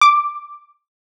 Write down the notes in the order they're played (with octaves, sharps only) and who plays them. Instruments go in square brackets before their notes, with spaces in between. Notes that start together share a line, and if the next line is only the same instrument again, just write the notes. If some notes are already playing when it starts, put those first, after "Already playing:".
[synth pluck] D6